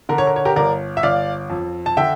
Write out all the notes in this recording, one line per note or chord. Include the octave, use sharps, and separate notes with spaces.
D3 A#4
C#5
A#4
C#5
G4 A#4
G1 A#4 D5
E5
G1 D5 F5
F2
A5
D3 E5 G5